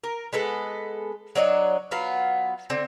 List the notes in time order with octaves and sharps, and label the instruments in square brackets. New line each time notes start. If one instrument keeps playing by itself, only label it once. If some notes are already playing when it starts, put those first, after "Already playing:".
[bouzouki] A#4
G#3 B3 A4 B4
F#3 D4 C#5 D#5
F#3 B3 F4 F5
D3 C4